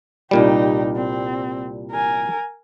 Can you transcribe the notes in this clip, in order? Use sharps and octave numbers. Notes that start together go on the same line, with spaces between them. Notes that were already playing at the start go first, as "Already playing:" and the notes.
C2 A#2 G3 D#4 G4
C4
A#4 G#5